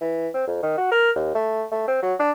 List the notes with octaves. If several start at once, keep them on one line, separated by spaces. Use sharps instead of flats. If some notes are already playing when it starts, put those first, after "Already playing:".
E3
C4
F2
D#3
F#4
A#4
D#2
A3
A3
C4
F#3
D4